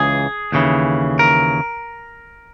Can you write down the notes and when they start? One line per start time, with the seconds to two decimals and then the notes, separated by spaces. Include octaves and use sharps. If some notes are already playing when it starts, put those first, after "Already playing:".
Already playing: C#2 C#3 E3 G#4
0.52 D#2 C#3 E3
1.19 A#4